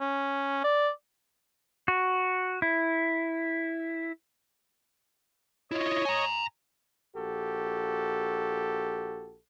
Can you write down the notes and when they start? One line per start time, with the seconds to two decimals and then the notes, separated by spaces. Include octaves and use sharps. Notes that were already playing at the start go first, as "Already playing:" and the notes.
0.01 C#4
0.64 D5
1.88 F#4
2.62 E4
5.71 E4 F4 C#5 D#5
6.05 G#5 A#5
7.15 A#1 F#4 G4 A4